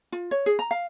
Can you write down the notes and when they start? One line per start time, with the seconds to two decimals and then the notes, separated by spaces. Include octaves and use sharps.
0.12 F4
0.31 C#5
0.46 G#4
0.59 A#5
0.71 F5